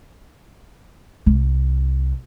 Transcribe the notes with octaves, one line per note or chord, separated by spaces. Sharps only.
C2